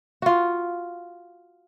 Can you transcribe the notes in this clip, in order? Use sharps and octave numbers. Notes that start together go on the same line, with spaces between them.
F4 F#4